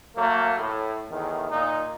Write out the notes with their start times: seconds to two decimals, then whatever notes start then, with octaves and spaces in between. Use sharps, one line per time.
0.15 F#3 A3 A#3
0.58 A2
1.09 E2 A2 D#3
1.50 A#2 D#4